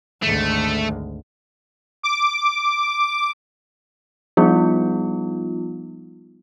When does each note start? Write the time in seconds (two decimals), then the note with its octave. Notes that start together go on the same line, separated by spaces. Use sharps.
0.22 G#1 D2 A3
2.03 D6
4.37 F3 G3 B3 D#4 F4